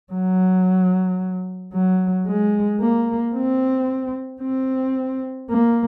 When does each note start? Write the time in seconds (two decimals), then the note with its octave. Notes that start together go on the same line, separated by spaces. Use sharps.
0.13 F#3
1.74 F#3
2.27 G#3
2.80 A#3
3.35 C4
4.42 C4
5.50 A#3